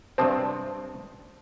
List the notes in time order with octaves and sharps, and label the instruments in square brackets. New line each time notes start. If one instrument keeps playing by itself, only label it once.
[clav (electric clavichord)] G2 C3 C4 [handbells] C5 A5 D#6